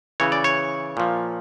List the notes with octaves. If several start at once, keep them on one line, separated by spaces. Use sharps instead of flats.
C#3 E3 C#5
D5
C#5
A#2 F3